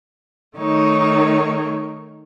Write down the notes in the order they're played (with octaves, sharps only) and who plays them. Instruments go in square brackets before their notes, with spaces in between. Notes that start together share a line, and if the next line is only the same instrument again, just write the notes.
[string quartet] D#3 A3 D#4 C#5